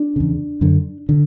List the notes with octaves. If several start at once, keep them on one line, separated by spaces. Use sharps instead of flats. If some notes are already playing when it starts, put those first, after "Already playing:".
Already playing: D4
E2 C#3
F#2 D3
D3